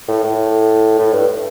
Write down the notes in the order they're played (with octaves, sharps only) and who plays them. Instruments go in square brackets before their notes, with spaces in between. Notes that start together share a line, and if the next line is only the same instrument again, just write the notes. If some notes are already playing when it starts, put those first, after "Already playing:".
[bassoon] A2
A2
A2
G2